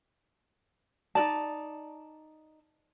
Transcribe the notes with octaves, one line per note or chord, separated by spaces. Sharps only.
D#4 A#4 D5 A5